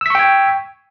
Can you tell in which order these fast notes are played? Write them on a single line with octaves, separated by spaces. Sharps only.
E6 B6 C#6 G5 G#6